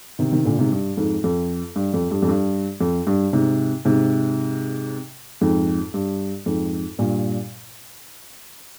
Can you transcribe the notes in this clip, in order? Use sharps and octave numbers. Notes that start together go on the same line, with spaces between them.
C3 D#3
C3 D#3
A#2 D3
G#2 C3
G2
F2 G#2
F2
G2
F2
G2
F2
G2
F2
G2
G#2 C3
G#2 C3
F2 G#2
G2
F2 G#2
G2 A#2